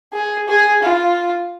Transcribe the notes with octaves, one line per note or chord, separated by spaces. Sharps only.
G#4
G#4
F4